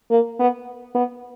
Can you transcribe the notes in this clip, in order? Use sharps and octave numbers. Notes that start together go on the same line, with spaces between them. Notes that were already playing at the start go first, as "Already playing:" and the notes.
A#3
B3
B3